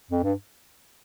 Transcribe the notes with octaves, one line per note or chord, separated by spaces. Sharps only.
F2
G2